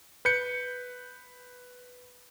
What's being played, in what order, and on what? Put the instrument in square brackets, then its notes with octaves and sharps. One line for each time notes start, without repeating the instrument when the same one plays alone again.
[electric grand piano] B4 G6 C#7